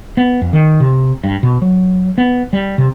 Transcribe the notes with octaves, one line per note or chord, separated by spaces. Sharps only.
B3
F2
D#3
C3
G2
B2
F#3
B3
G3
C3